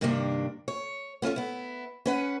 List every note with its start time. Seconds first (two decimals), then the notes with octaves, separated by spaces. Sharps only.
0.01 G2 C3 D#3 A#3 C#4 D4
0.68 C#5
1.22 B3 C#4 F4 A4 C#5
1.36 B3 E4
2.06 C#4 B4 F#5